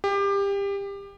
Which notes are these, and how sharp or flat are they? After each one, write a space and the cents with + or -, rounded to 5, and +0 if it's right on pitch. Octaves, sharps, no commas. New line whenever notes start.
G4 +25